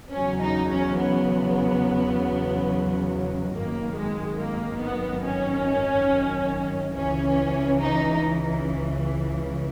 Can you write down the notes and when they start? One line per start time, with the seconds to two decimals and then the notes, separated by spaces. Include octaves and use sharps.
0.13 E2 C#3 F#3 C#4
0.42 D#4
0.71 C#4
0.99 B3
3.54 G#1 F#2 D#3 A#3
3.96 G#3
4.39 A#3
4.82 B3
5.24 C#4
6.94 C#2 C#3 E3 C#4
7.80 D#4